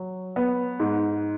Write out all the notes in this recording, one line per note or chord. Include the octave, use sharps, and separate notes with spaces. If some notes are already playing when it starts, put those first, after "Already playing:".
Already playing: F#3
B3
G#2